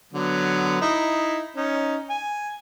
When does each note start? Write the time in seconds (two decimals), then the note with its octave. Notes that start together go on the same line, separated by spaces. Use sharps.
0.13 D3 F#3 B3
0.81 D#4 E4
1.56 C#4 D#4
2.09 G#5